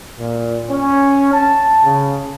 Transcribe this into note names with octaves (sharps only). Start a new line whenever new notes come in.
A#2
C#4
A5
C#3